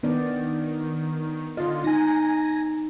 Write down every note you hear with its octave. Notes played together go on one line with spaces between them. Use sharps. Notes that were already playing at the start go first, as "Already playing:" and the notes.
D#3 B3 D4 D5
D3 F4 D#5
D#4 G#5 A#6